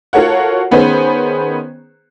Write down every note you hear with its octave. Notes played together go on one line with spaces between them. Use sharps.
F4 F#4 A4 A#4 C#5 F#5
D#3 B3 C#4 G#4 B4 C5